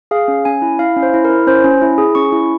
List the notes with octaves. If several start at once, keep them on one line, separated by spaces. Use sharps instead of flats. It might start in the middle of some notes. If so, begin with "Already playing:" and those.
G#4 F5
C#4
C#4 G#5
E4
E4 F5
C#4
C5
E4
A#4
E4
C#4 C5
C#4
E4
G#4
C#4 C#6
E4